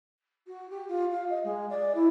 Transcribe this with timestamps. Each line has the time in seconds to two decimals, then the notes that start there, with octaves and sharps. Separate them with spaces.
0.47 F#4
0.70 G4
0.88 F4
1.11 F5
1.29 D#5
1.44 G#3
1.70 D5
1.94 E4